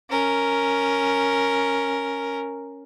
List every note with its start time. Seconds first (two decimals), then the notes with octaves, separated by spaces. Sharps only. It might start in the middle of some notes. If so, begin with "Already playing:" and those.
0.10 C#4 A#4